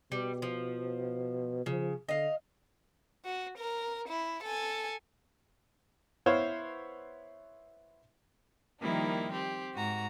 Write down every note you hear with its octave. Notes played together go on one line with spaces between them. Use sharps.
B2 G3
F3
C#3 F3
D3 D#5 F5
F#4
A#4
E4
A4 G#5
B3 E4 C5 C#5 F5
D#3 F3 G3 A#3 D#4 E4
C4 G4
G#2 F#4 A#5